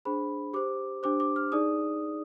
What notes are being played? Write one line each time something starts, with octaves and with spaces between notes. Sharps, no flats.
D4 G#4 C5 B5
G4 C5 D6
D4 G4 C5 D6
D6
F6
D#4 G#4 D5 D#6